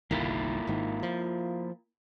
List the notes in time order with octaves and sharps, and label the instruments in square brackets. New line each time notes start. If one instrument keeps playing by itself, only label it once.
[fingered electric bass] G1 C2 D#3 [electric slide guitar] A#3 E4 F4
[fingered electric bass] G#1 G#2 D#3
F3